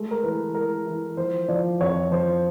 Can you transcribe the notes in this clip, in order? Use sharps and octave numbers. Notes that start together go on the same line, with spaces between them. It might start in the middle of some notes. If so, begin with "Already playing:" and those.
Already playing: G#3 A3
A#4
E3 B4
G#3 A#4
E3
F3 C5
F3 D5
F2 C#5
F3 C5